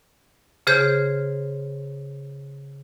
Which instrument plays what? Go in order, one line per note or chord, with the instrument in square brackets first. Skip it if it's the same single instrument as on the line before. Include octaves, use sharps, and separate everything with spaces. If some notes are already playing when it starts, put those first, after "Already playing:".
[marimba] C#3 G#4 C5 F6 G6